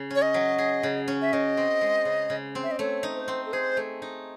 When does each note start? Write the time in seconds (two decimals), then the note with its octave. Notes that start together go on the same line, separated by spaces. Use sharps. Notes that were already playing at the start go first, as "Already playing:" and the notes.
Already playing: C#3
0.10 C#4 C#5
0.22 D#5
0.34 F#3
0.58 G#4
0.83 C#3
1.08 C#4
1.22 E5
1.33 C#3 D#5
1.57 C4
1.81 G#3
2.05 C#3
2.30 C#3
2.55 C4
2.63 E5
2.71 D#5
2.79 A3 C#5
3.03 D#4
3.16 C5
3.28 C4
3.45 A4
3.53 G#4 C5
3.77 A3
4.02 D#4